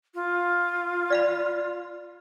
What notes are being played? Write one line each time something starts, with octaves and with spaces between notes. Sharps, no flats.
F4
D5 F5 B5